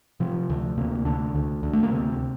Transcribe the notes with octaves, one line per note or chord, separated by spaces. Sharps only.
C3 F3
D2
C3 A#3
D2 D4
D2
D2
A3
A#3
C3 C4